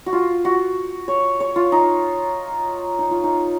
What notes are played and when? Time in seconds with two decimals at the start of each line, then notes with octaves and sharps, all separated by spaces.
0.06 F#4
0.13 F4
0.45 F#4
1.08 C#5
1.40 C#5
1.56 F4
1.72 D#4
2.99 D#4
3.11 F4
3.23 D#4